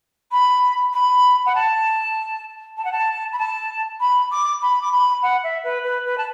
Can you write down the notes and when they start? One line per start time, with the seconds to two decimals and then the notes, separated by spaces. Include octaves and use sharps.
0.31 B5
0.93 B5
1.46 F#5
1.55 A5
2.77 A5
2.84 F#5
2.92 A5
3.32 B5
3.39 A5
4.00 B5
4.31 D6
4.61 B5
4.81 D6
4.92 B5
5.22 F#5
5.43 E5
5.64 B4
5.84 B4
6.05 B4
6.18 A5